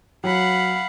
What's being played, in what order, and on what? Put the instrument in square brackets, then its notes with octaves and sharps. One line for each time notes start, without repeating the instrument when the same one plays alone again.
[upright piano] F#3 [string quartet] F5 F#5 B5